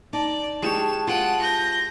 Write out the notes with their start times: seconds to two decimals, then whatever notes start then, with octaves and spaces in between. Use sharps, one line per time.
0.13 D#4 D5 A5
0.62 G#3 G4 C#5 E7
1.07 F4 F#5 G5 D#7
1.42 G6 A#6